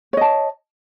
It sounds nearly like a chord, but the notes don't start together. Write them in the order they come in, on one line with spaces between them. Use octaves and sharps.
C#5 D#5 A5